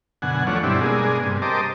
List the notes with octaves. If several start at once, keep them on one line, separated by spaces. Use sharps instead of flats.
F#2 B2 D3 F#5 G#5
D#2 F3 A3 D4 C#5 F#5
G2 B2 G3 C4 D4 E4
B2 G#3 A#3 D4 G#4
G2 C3
G4 A#4 C5 D#5 A5 D6